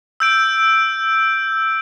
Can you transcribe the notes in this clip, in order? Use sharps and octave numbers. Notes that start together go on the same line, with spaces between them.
E6 G6 D7